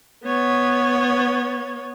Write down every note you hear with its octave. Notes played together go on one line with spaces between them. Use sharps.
B3 C#5